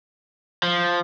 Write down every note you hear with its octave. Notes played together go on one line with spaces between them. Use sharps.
F3